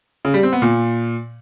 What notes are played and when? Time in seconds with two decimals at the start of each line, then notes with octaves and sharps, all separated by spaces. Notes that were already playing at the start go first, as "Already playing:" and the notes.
0.25 C#3
0.34 G3
0.43 C4
0.53 B3
0.62 A#2